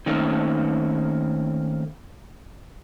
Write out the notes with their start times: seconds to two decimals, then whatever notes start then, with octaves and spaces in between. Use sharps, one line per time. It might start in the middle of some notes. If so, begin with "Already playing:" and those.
0.06 D#3 A3 A#3 C4 C#4 D#4